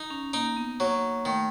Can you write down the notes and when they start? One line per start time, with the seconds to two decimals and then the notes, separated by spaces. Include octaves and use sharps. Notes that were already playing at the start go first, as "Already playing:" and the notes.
Already playing: D#4
0.10 C#4
0.33 A#3 D#4
0.57 B3
0.80 F#3 A#3
1.25 D#3 A3